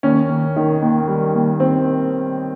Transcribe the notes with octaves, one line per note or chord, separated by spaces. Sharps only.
D#2 C#4
D#2
D#3
D#2
G3
D#2
D#2 C4